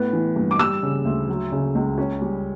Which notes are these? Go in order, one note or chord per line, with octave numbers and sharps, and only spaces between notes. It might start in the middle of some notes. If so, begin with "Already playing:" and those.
Already playing: A2 B3
E3
G2
D6
G3 E6
C#3
D2
F#3
C#3
C#2
C#4
G3